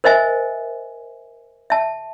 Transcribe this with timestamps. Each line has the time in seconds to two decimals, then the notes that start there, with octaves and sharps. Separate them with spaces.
0.04 A#4 C5 D#5 E5 G#5
1.70 E5 A5